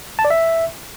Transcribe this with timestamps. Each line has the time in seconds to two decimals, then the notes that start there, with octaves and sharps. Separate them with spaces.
0.19 A5
0.25 D5
0.30 E5